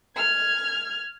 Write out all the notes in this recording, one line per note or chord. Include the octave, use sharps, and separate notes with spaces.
F6 G#6